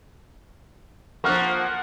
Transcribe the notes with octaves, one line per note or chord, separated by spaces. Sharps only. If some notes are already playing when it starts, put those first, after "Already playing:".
F3 A#3 F#5 C#6 F6 F#6